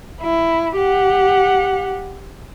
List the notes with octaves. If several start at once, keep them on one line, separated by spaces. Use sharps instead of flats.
E4
G4 F#5